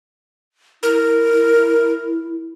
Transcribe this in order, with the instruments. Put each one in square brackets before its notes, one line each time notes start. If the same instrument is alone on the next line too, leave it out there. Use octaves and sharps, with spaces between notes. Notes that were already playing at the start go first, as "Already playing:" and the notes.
[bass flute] E4 [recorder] A#4